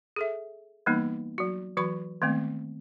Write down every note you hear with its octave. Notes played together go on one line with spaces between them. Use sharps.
G#4 A4 E5
E3 G3 A#3 B3 D#4
F#3 F#4
E3 F#3 F#4 B5 C#6
D#3 G#3 A3 B3 C4